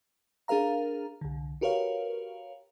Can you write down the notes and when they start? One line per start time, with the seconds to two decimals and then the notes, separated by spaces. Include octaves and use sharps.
0.48 D4 G#4 A#4 F5 A#5
1.21 C2 D3
1.61 F#4 G4 A#4 B4 C#5 F5